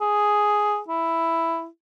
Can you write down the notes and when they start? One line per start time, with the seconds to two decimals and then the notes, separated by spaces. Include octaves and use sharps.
0.01 G#4
0.88 E4